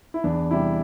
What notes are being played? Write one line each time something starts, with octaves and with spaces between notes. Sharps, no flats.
E4
E2 D4
C3 G3 E4